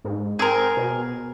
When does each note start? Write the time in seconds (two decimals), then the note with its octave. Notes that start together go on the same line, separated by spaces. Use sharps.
0.05 G#2
0.39 C4 G#4 A#4
0.77 B2